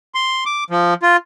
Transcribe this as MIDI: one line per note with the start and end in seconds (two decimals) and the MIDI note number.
0.15 0.44 84
0.46 0.64 86
0.70 0.94 53
1.03 1.17 65